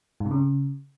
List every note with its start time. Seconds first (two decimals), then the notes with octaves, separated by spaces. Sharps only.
0.20 G#2
0.26 C3
0.31 C#3